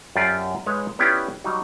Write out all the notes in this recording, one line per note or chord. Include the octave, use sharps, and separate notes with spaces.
F#2 F4 G4 D5
G#3 D#4 B4 C#5 F5
B3 C#4 E4 F4 G4 D5
F#3 G3 D#4